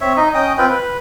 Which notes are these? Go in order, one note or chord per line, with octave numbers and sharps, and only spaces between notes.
C4 C#5 E5
D#4 D#5
C#4 D#5 G5 D#6
C4 F4 B4 G5
B4